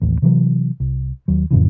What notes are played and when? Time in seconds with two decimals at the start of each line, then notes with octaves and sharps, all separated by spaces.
0.02 A1 D#2
0.22 C3 E3 F#3
0.80 C2
1.28 D#2 F#3
1.51 F2 A2 C#3 E3